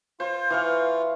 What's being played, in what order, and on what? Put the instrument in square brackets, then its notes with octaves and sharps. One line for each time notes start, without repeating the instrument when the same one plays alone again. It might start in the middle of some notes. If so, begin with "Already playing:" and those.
[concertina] F4 [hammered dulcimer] C5
[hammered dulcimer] E3 F5 C#6